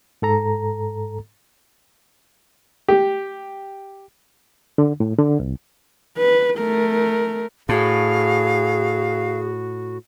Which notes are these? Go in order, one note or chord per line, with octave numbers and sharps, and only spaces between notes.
G#2 A4 A#5
G4
D3
A2
D3
C2
B4
A3 A#4
A2 F#4 G#4 F5